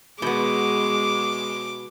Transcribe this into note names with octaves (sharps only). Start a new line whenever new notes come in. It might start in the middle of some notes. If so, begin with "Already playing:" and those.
B2 G#3 B3 D6